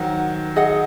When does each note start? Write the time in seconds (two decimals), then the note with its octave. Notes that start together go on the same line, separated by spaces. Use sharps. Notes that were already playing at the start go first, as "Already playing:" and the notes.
Already playing: D#3 F#3 C5 F#5
0.56 G#4 D#5 F#5